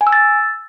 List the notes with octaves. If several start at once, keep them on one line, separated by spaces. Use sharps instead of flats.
G#5
E6
A6